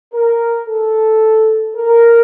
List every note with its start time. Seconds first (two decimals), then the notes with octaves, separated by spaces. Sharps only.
0.13 A#4
0.67 A4
1.75 A#4